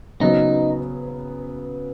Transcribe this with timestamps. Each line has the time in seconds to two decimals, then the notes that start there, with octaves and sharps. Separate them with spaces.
0.21 C#3 F#3 B3 D#4